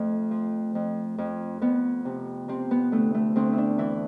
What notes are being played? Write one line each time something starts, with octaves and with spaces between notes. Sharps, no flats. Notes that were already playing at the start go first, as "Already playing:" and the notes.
Already playing: F2 A3
F3
F2
F2
F2 B3
C3
C3 C4
B3
D2 A3
A3
D2 C4
E4
D4
E3 E4